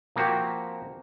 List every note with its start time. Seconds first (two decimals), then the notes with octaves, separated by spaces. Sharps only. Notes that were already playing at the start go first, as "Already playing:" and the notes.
0.16 F3 A#3 C4 F#4 G4